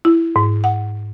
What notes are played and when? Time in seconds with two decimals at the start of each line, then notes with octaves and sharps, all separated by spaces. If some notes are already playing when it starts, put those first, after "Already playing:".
0.05 E4
0.36 G#2
0.64 F#5